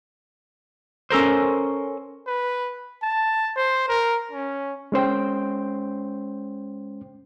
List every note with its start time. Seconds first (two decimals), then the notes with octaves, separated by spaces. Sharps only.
1.10 C#4 A4 A#4 C5
2.27 B4
3.02 A5
3.57 C5
3.89 A#4
4.32 C#4
4.92 G#3 C#4 C5 G5